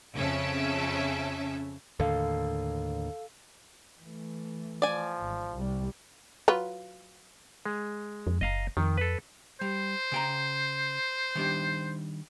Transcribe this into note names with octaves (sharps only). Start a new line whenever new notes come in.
F2 C#3 C#4 E5 A5
D#2 A2 D3 A4 F5
E3 A3
F3 D5 G#5
G#1
C2 G3
F#3 F4 B4
G#3
F2
F#1 D#5 F5 A#5
F2 D#3
A4 B4
G3 C5
C#3 G5 A#5
D#3 G3 D4